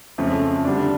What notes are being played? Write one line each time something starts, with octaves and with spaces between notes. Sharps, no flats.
F2 C#3 F3 A3
D3 G3 D4